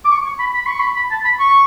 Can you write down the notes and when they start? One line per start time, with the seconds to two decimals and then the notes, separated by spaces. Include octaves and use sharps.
0.05 D6
0.11 C#6
0.25 C#6
0.40 B5
0.54 B5
0.67 C#6
0.80 B5
0.96 B5
1.11 A5
1.25 B5
1.40 C#6